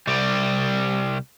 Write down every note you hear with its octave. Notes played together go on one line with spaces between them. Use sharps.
C2 G3